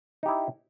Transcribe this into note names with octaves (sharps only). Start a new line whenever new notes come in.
D#4 E4 G4